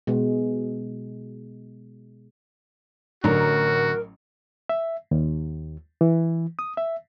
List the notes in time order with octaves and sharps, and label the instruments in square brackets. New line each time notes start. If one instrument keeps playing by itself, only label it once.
[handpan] B2 G#3
[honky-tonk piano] A1 F#3 A#5 [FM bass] D3 [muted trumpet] F#4 [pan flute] A#4
[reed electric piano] E5
D#2
E3
D#6
E5